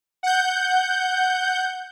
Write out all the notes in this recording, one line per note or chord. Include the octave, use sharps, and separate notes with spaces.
F#5 G6